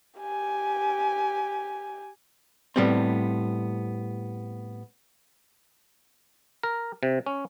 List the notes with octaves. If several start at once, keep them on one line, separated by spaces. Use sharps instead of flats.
G4 G#5
A2 G3 B3 C4
A#4
C3
C#4